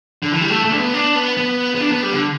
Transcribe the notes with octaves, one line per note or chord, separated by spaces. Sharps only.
D3
E3
G3
A3
A3
D4
B3
D4
B3
B3
B3
D4
B3
G3
D3